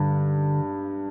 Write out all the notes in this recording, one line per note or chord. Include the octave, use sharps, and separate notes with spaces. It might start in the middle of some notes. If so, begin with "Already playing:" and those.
Already playing: G2 D3